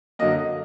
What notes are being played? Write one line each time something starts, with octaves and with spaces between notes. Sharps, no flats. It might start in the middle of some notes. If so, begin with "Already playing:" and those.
F#2 D3 F#3 A#3 D#5